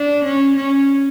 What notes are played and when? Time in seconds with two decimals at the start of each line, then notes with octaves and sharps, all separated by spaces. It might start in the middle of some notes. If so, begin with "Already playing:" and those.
Already playing: D4
0.25 C#4
0.56 C#4